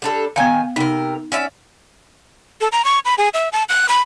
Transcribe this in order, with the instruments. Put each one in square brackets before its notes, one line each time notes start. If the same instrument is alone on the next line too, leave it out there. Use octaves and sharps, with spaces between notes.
[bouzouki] G3 D4 A4
[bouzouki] D#3 G#5 [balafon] B3 F5
[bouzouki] C3 A#4 [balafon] D#4
[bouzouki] C#4 D5 E5
[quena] A4
A#5
C#6
B5
G#4
E5
A5
F#6
B5